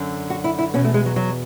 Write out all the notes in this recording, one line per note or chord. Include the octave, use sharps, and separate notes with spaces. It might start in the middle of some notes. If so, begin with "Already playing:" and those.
Already playing: F#2 D3
F#4
E4
E4
E2 B2 C#4
A3
G#3
F#3
F#3